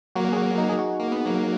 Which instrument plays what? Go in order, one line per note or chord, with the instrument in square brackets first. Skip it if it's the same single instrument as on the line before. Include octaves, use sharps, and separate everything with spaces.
[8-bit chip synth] F#3 A#3 [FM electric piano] F#4
[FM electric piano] G#4
F#4
D#4
G#4
F#4
[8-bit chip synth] A#3
B3
F#3 A#3